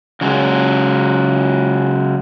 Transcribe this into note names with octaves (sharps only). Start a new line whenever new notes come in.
C#3 F#3 G#3